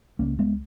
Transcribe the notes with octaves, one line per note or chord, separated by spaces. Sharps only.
C#2 C#3 A#3 C#4
G#3 B3